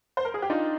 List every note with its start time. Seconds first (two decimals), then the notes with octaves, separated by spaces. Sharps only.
0.17 C5
0.25 A#4
0.34 G#4
0.42 G4
0.50 D4 D#4 F4